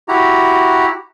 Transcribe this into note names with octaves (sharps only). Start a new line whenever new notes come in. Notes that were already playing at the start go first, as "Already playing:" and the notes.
E4 F#4 G4 A#5